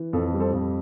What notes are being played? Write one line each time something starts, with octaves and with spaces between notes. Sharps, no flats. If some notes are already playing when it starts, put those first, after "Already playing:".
Already playing: E3
F2 A4
G3
A4 C5
F2